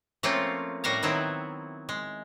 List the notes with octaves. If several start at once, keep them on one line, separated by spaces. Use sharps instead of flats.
F3 A3 A#3 C4 C#4 F4
A2 G3 F#4 A#4 F5 A#5
D#3 F#3 B3 C4 E4
G#3